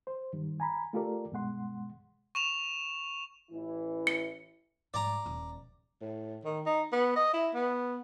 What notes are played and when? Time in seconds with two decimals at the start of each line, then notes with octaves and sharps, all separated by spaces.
0.07 C5
0.33 G2 D#3 G3
0.60 G#5 A#5 B5
0.93 A3 F4 G4 A4 A#4 D5
1.31 C2 G2 B2 G#3 F#5 C6
2.35 C#6 E7 F7
3.51 A1 E3 E4
4.07 C#7
4.94 G#2 G3 D5 A#5
5.26 D#1
6.01 A2
6.44 D#3
6.66 D#4
6.92 B3
7.16 D#5
7.33 E4
7.54 B3